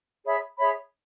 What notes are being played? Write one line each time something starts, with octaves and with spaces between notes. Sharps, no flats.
G#4 C#5 E5 B5
G#4 C#5 E5 B5